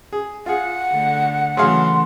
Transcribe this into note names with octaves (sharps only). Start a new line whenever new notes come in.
G#4
F4 G#4 F#5
D3 A3
C#3 E3 F#3 A3 G#4 F5 C6